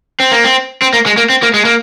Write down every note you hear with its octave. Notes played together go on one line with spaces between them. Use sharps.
C4
A#3
C4
C4
A#3
G#3
A#3
C4
A#3
G#3
A#3